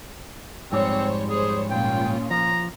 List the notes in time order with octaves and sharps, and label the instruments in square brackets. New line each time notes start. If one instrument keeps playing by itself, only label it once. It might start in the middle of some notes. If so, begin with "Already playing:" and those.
[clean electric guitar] F2 G#2 G3 [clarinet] C4 [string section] C5 C#5
[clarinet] G#4 [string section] C5 C#5
[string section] A#2 C#4 F4 [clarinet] G5
[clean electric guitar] F3 [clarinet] A#5